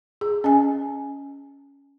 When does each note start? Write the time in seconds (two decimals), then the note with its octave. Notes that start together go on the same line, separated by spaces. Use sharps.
0.21 G#4
0.44 C#4 D#5 G#5